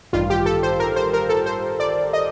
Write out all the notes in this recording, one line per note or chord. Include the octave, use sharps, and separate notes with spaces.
A1 G2 D#3 G3 F4
G4
A4
C5
A#4
C5
A#4
A4
C5
D5
D#5